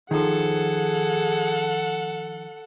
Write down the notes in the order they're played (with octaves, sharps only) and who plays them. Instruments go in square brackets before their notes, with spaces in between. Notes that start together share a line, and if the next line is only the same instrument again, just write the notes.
[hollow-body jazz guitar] D#3 F3 [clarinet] G#4 [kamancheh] A4 F#5